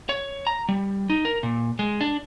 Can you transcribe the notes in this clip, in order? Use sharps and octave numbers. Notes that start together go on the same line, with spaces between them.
C#5
A#5
G3
D#4
A#4
A#2
G#3
D4